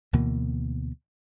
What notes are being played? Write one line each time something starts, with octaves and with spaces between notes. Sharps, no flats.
D2 B2 E3 A#3